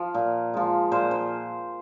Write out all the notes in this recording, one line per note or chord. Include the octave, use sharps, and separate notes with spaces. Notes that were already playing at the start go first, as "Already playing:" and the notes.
Already playing: F3 F5
A#2
F3 G#3
A#2 C5
C5